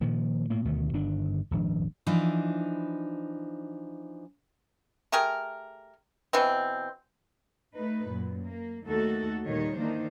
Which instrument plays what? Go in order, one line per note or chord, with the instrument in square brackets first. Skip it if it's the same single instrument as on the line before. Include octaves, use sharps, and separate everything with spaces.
[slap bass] A#2 D#3 F3
A2 A#3
D2 B2 D#3 A3
G1 D#3 D4
D#1 G#1 F3 D4
[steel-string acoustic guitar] E3 F3 D4 D#4
[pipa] A3 G4 G#4 A#4
B2 E3 C4
[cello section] A3 D#4 B4
F#2 A#2
A#3
D#2 A3 D#4 F#4 A4
D#2 A#2 D#3 G3 C#5
D#3 E3 A#3 D4 D#4 C5